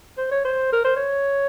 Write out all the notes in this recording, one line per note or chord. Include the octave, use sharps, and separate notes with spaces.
C5
C#5
C5
A#4
C5
C#5